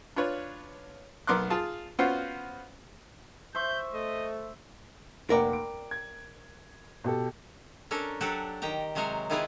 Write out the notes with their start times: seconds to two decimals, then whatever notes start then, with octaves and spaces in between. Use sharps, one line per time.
0.16 D4 F4 B4 C#5
1.27 B1 B3 A#4 C6 D6 F#6
1.50 F4 G#4 A5
1.99 B3 C#4 F4 F#4 C5 F5
3.55 C5 E5 C#6 G6
3.93 A3 D#5
5.30 F1 A#3 A#4 D5 F#5 G5
5.53 D7
5.91 G#6
7.04 B2 G4 A4
7.91 C#4 D4 A4 A#4
8.21 F#3 D4 F#4 G4 A4
8.62 D#3 G4 G5 A#5
8.95 C3 F#3 G#3 A#4 C5 C#5
9.30 D#3 E4 F4 G#4 A#4 B4